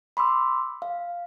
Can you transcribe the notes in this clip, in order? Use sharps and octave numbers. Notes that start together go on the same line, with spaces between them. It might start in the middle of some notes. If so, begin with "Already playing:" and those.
B5 C6 D6 E6
F5